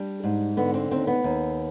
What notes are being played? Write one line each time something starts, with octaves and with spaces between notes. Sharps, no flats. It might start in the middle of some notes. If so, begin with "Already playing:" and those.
Already playing: G3 D4
G#2
D3 B3
C4
D#2 C4
B3
D#2